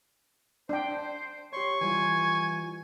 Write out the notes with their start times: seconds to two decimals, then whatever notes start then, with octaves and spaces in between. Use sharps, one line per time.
0.69 D4 C5 G5
1.53 G4 C#5 C6 C#6
1.81 E3 G3 F4 G#5